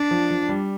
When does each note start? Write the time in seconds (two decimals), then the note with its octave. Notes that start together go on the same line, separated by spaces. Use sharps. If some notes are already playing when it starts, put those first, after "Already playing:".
Already playing: D4
0.11 F3
0.31 F3
0.49 G3